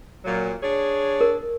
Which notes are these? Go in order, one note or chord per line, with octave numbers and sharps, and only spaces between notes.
A#2 F#3
D4 G#4 C#5
A#4